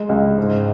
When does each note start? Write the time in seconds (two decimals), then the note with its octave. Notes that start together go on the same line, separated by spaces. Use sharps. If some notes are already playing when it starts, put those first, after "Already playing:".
Already playing: G#3
0.09 C#2
0.38 G#2